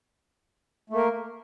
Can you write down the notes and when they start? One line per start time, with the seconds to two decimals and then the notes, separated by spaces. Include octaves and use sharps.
0.90 A3
0.93 A#3
0.96 A#4